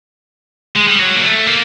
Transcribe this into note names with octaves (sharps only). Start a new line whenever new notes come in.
G#3
G3
F#3
A#3
A3
A#3